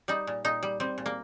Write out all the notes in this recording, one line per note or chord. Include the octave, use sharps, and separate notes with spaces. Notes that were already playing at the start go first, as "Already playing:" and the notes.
G3 D#4
A#2
A#2 D#4
G3
G3 C4
A#2
A#3